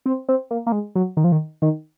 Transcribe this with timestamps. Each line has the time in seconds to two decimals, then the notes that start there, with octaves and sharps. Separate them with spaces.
0.06 C4
0.29 C4
0.51 A#3
0.66 A#3
0.72 G#3
0.95 F#3
1.17 D#3
1.24 F3
1.32 D#3
1.62 D#3